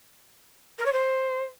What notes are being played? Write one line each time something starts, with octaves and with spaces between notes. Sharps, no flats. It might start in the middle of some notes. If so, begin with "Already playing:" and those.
A#4
C#5
C5